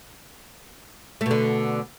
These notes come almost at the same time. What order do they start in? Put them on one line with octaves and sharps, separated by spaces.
A3 B2 D3